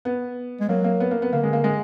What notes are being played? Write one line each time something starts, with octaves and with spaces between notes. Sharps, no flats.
B3
G#3
F#3 A#3
A#3
B3
A#3
B3
D3 A#3
G#3
A#3
G#3